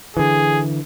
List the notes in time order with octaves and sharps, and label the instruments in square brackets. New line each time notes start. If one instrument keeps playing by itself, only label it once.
[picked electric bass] D3 E3 [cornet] G#4